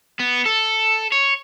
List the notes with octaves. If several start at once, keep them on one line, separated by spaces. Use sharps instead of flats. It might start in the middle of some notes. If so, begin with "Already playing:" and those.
B3
A4
C#5